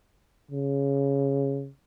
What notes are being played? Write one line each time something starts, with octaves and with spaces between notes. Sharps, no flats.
C#3